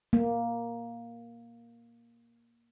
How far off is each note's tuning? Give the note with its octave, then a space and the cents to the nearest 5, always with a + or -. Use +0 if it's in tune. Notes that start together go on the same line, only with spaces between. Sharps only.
A#3 +5